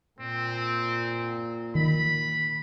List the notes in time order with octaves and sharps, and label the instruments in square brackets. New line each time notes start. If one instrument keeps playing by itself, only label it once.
[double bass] A#2 [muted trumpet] C4
[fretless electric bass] D#3 [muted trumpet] B5